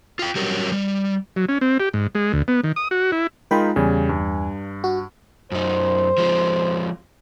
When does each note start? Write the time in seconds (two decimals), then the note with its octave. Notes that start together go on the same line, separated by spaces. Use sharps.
0.19 F4 G5
0.35 F#3 G3 G4 A#4 C#5
0.72 G3
1.36 F#3
1.49 C#4
1.61 C4
1.80 G4
1.94 G#2
2.15 G#3
2.33 D2
2.48 B3
2.64 D#3
2.76 D#6
2.91 F#4
3.12 E4
3.51 G#3 D#4 F4 A#4 G5 B5
3.76 E2 C#3 G3 G#5
4.09 G2
4.84 F#4
5.52 F#2 D#4 C5
6.18 F3 G#3 C4